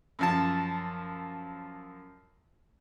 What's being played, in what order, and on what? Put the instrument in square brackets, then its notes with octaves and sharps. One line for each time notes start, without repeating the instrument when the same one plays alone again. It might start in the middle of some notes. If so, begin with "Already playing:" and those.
[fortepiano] F#2 F3 A5